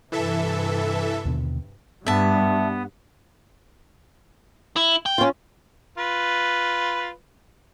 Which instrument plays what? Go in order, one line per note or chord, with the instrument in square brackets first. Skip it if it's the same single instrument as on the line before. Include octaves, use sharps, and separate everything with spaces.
[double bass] G2 C3 [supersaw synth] E3 A4 E5
[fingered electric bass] D#2 B2 D3
[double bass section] G2 [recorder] B3 [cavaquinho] E5 A5
[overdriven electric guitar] E4
G5
[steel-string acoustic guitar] C#4 F4
[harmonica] F4 B4